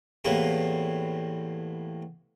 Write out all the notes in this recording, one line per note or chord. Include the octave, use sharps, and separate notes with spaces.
E2 A2 A#3 C4 G4 B4